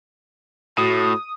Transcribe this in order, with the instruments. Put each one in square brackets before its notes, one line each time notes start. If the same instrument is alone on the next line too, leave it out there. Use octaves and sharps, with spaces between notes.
[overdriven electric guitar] A2 [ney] F#4 [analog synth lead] D#6